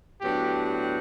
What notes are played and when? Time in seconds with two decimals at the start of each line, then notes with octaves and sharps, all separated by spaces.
0.21 A2 F#3 B3 D4 G4
0.65 G4